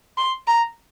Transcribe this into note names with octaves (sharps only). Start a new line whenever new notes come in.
C6
A#5